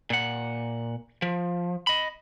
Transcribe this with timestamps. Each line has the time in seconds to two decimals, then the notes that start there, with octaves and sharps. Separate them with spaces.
0.10 A#2 F#5
1.22 F3
1.87 D#5 B5